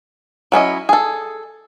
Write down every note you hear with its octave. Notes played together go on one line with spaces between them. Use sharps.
F#3 C#4 E4 D#5
G#4 A4